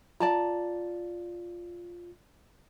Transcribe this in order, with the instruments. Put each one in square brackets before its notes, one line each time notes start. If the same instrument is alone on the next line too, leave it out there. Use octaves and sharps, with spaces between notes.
[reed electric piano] F4 [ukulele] D5 A5 A#5